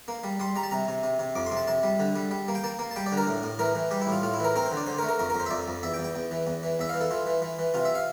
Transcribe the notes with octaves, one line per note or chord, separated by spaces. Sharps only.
A#3
G3
G3 C6
G3 A#5
A5
C3 A#5
C3
C3
C3
F2 D6
C6
C3
A5
C3 A5
G3
D3
G3
G3
A#3
G5
A#3 A5
A#3
A5
G3 G5
D5
D3
A#4
A2
A2
E3 A#4
E3
G3 G4
E4
A2 F4
A2 F4
E4
E3 A#4
C4 A#4
C5
D3
D5
D3 C5
A#4
A3
A#4
F2 A#4
F2 A#4
C5
E5
F2 D5
F2
E2 E5
G5
E2
G5
E2
E3
E2
E3
E2 E5
E3 F5
A4
E3 F4
E3
E3
E3
C3 F4
E5
F5